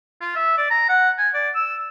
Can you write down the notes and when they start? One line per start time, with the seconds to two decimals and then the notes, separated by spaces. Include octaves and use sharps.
0.21 F4
0.36 E5
0.57 D5
0.70 A#5
0.89 F#5
1.18 G#5
1.34 D5
1.55 E6